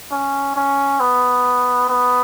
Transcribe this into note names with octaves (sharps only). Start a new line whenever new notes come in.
C#4
C#4
B3
B3